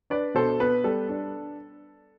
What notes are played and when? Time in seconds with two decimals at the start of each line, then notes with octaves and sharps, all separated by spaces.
0.10 D4 B4 D5
0.34 B2 A4 C5
0.60 B3 B4
0.84 G3 A4
1.09 D4